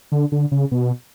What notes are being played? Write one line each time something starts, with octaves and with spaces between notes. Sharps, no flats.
D3
D3
C#3
B2